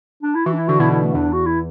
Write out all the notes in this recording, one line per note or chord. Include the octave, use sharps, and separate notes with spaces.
D4
E4
E3 F#4
D4
E4
D3 F#4
B2 E4
E4
A3
E2 D4
F#4
E4